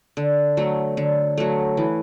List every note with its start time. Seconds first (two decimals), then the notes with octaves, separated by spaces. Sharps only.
0.17 D3
0.57 F#3 A3
0.97 D3
1.38 F#3 A3
1.77 E3